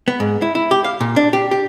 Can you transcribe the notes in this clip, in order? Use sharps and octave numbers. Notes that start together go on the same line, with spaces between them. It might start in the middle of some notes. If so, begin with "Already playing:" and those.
B3
G#2
E4
E4
G4
F5
A#2
D4
G4
G4